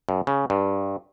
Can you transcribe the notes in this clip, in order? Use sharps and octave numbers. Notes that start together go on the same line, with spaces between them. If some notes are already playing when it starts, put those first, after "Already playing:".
F#2
C#3
G2